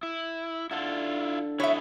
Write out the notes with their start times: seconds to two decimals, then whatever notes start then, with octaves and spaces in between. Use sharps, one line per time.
0.03 E4
0.71 D3 E4 F4 A4
1.60 E4 F#4 C#5 D#5 E5 B5